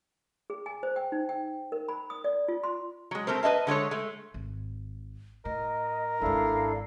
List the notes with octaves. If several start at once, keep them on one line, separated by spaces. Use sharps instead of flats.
G#4
G#5
C5
G5
D#4
G5
A#4
B5
D#6
D5
F4
C6
F#3 G#3
A3 C4 A#4 C5
B4 D#5 E5 A5
D3 G#3 A3 C#5
G#3 A3
G#1
A2 A#4 D#5
G#1 G#2 D4 E4 A4 F5